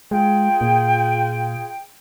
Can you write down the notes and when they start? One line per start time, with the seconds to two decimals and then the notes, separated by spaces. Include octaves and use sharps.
0.11 G#3 F4 G#4 G5
0.61 A#2